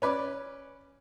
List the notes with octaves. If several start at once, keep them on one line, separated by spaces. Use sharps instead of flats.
C#4 B4 D5